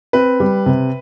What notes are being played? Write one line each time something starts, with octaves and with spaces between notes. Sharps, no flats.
C4 B4
G3
C3